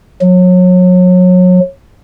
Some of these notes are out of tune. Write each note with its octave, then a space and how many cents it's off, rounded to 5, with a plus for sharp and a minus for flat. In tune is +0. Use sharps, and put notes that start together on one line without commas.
F#3 -30